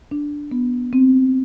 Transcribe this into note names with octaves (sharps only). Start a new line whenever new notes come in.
D4
B3
C4